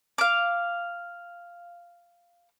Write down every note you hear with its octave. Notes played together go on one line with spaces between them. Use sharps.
F5 D6